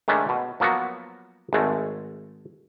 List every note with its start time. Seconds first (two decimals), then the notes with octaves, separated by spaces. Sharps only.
0.08 D#3 G#3 A3 C#4 D4
0.29 B2
0.60 F3 F#3 A#3 B3 F#4
1.53 G#1 G#3 A3